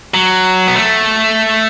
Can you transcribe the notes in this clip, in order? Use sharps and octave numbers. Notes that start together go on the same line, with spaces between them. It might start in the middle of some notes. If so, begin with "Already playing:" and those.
F#3
B3
A3